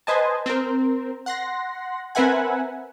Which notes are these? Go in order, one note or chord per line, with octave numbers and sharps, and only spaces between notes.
B4 C5 D#5 G#5 A5
C4 A#4
F#5 C6 A#6
C4 A#4 B4 E5 F#5 G#5